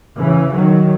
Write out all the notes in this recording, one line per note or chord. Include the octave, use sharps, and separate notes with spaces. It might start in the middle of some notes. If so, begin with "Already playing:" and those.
C#3 E3
D#3 F#3